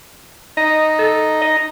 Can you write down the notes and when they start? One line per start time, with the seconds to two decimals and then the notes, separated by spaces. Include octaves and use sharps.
0.57 D#4 D#5
0.99 A4
1.42 D#5